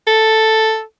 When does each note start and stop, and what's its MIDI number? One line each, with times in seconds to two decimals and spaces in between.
0.07 0.82 69